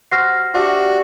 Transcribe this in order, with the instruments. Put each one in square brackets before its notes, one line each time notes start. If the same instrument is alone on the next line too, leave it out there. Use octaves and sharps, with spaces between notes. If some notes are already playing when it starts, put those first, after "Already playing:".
[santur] F#4 C5 [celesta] F6 A#6 C7
[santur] D4 G4 E5 [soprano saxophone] F#4